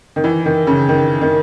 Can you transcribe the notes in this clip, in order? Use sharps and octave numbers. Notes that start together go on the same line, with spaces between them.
D#3
E3
D#3
C#3
D#3
D#3